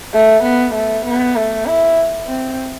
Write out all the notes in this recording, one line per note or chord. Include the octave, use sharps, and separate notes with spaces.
A3
B3
A3
B3
A3
E4
C4